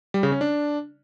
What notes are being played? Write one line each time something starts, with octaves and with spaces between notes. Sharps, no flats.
G3
C#3
C#4
D4